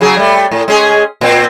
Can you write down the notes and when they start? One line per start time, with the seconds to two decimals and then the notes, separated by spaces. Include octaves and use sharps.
0.01 C#3 F#3 G#4
0.17 G3 A3
0.51 A2
0.68 G#3 C#4 G#4
1.21 A#2 C4